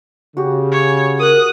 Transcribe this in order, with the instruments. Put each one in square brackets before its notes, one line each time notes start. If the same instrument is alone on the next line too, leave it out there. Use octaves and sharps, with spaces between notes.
[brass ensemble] C#3 [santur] F#4 G4
[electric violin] C#5
[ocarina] A#4 [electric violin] D#6 F#6